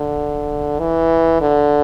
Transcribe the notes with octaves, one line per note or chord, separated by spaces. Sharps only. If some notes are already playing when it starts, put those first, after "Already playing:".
Already playing: D3
E3
D3